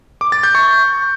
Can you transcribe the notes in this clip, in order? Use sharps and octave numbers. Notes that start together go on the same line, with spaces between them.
D6
A6
G6
C#6